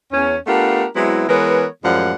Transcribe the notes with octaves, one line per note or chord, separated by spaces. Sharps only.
E2 C#4
A3 B3 D4 F4 G4 A#4
F#3 G#3 B3 C4 E4
E3 G#3 B3 A#4 B4 C#5
F#2 A2 F3 G3 G#3 F#5